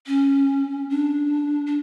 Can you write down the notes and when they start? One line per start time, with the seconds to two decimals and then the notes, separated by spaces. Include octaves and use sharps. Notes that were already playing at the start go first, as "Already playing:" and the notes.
0.07 C#4
0.90 D4
1.66 D4